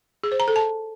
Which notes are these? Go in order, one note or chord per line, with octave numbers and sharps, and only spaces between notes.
G#4
C5
A#5
A4
A5